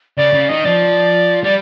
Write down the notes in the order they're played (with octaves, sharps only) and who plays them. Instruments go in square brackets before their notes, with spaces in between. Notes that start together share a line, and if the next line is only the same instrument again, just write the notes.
[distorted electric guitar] C#3 [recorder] D5
[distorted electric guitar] C#3
[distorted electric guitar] D#3 [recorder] D#5
[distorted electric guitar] F3 [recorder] D5
[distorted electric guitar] G3 [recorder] D5